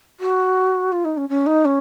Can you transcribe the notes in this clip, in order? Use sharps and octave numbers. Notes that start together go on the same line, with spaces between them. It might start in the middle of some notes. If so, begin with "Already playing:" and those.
F#4
F4
D#4
C#4
C#4
D#4
C#4